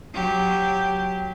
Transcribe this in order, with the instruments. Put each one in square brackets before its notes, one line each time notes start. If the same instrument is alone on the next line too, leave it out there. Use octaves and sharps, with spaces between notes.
[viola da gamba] F#3 G4